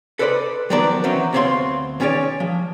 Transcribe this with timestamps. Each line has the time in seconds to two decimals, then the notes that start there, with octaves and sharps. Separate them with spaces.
0.19 A4 B4 C5 D5 D#5 B5
0.70 D#3 F3 F#3 B3 A#4 D5
1.04 E3 F#3 C4 C#4 F#4
1.33 D2 B3 C4 C#5 F5 C6
2.00 D#3 C#4 G#4 C#5 D5
2.40 F3